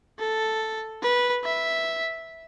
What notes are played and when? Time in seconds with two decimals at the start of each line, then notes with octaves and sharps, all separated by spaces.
0.19 A4
1.02 B4
1.44 E5